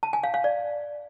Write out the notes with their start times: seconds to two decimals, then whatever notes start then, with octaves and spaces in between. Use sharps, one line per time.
0.03 A5
0.13 G#5
0.24 F5
0.34 F5
0.44 D5